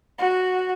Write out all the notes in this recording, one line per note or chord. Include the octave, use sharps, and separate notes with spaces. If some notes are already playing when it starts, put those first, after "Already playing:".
F#4